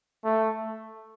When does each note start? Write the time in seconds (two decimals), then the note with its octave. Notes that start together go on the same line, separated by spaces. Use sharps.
0.25 A3